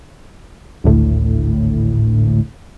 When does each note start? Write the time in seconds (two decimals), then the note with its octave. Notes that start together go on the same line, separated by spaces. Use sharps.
0.84 G#1 D2 A2